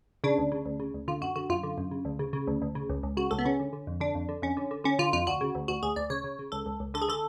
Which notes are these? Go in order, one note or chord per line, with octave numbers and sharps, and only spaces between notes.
C#3 D4
D2
C#3
D2
C#3
D2
D3 F4
F#2 F#4
D3 F#4
F#2 F4
D3
F#2
C#3
D2
C#3
C#3
D2
D2
C#3
C#2
C#2
C#3 F#4
C#2 A4
B3
C#3 C#4
D3
D3
F2
D3 D4
F2
D3
F2 C#4
D3
D3
D3 C#4
D3 F4
F2 F4
D2 F#4
C#3
D2
D2 F#4
D2 G#4
D2 D5
C#3 C#5
C#3
C#3
C#2 A4
C#2
C#2
D3 A4
G#4
D3 A4